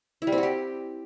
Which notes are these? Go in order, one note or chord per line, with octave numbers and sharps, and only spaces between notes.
E4
G3
C4
F#4
G4